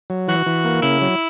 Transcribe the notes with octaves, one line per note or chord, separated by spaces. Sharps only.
F#3
E3 F#4
E3
A#3
C#3 E4
F#3